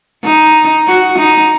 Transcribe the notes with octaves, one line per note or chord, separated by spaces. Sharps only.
D#4
F#4
D#4